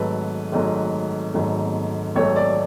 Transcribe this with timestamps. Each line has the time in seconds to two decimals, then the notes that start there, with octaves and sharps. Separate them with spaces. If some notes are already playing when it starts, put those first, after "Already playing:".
Already playing: G#1 G#2 F#3 A3 B4
0.52 G#1 G#2 F#3 A3
1.34 G#1 G#2 F#3 A3
2.16 G#1 G#2 F#3 A3 C#5
2.36 D5